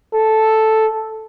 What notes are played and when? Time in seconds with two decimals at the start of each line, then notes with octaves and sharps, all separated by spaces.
0.14 A4